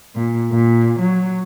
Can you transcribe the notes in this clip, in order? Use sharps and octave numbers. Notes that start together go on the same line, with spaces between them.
A#2
A#2
F#3